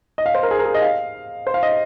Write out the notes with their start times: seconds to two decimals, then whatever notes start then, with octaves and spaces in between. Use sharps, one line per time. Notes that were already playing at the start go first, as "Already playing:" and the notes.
0.18 D#5
0.26 F5
0.35 C5
0.43 A#4
0.51 G#4
0.59 A#4
0.66 G#4
0.74 D#5
0.82 F5
1.47 C5
1.54 F5
1.63 D#5